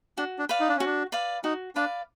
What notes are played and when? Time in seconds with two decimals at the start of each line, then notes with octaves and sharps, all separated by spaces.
0.18 D4 F#4
0.39 D4
0.49 B4 D5 F5
0.60 D#4
0.69 D4
0.76 C#4
0.80 F#4
0.85 D4
1.12 B4 D5 F5
1.44 D#4 F#4
1.76 D4 B4 D5 F5